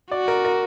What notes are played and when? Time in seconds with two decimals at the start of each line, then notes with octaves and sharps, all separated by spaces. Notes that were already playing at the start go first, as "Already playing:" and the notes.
0.11 F#4 D5
0.28 A#4
0.45 A#4